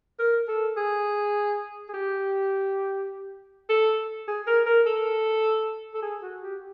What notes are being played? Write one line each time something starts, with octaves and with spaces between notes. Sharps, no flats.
A#4
A4
G#4
G#4
G4
A4
G#4
A#4
A#4
A4
A4
G#4
F#4
G4